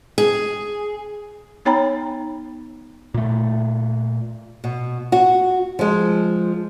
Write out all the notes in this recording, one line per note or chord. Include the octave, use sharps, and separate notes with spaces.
G#4
B3 D#4 C#5 G5 A#5 B5
A#2 A3
B2
F#4
F3 G#3